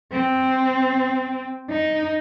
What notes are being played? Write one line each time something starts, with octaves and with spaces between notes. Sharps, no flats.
C4
D#4